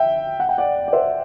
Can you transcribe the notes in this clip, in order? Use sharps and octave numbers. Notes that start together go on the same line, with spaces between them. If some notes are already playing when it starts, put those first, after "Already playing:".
Already playing: E5 G5
F#5
G5
D5 F#5
D5
C5 E5